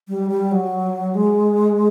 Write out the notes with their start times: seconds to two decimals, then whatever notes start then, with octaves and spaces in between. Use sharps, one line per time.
0.08 G3
0.30 G3
0.51 F#3
1.14 G#3